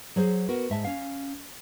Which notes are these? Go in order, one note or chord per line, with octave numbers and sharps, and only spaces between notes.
F#3 G#4 C5
B3 F#4 A#4
G#2 E5 A5
C#4 F5